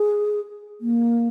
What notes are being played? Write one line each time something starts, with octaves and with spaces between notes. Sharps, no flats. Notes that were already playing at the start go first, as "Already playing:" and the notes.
Already playing: G#4
A#3